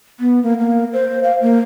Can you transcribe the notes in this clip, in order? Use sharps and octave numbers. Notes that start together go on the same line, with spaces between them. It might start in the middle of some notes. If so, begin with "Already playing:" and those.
B3
A#3
A#3
C5
F5
A#3